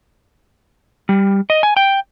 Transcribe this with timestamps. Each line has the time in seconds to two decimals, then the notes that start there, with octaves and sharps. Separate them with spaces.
1.09 G3
1.50 D#5
1.63 G#5
1.77 G5